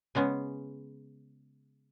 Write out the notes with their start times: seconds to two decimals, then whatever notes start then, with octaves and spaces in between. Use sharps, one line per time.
0.15 C#3 G#3 B3 C#4